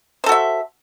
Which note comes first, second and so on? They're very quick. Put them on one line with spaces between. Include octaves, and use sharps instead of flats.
C5 A4 F#4 E5